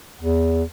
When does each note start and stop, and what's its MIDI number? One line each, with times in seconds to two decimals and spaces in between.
0.22 0.64 40